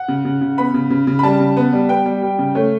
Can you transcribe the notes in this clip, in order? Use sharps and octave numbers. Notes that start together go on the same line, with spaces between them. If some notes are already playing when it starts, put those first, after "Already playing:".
Already playing: F#5
C#3
C#3
C#3
B3 B5
C#3
C#3
C#3
B5
G3 A5
C#3
B3
G3
B3 G5
G3
G3
C#3
A3 C#5